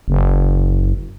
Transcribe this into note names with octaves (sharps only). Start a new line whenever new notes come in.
F#1